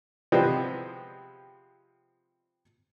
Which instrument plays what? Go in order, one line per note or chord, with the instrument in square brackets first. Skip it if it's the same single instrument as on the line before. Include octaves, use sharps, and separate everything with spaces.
[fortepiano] C3 F3 G#3 B3 C4